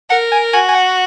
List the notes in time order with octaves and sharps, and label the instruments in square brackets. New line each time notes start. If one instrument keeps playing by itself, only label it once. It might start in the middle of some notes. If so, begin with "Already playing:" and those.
[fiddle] A#4 [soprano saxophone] F#5
[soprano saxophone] G#5
[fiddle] F#4 [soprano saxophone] G#5
[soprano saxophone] G#5
F#5